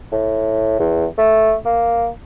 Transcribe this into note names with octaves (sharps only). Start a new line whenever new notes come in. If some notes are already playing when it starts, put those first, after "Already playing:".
A2
E2
A3
A#3